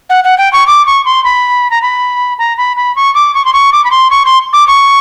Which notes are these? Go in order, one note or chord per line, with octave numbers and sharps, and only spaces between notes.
F#5
F#5
G5
C#6
D6
C#6
C6
B5
A#5
B5
A#5
B5
B5
C#6
D6
C#6
C6
C#6
D6
B5
C6
C#6
C6
D6
C#6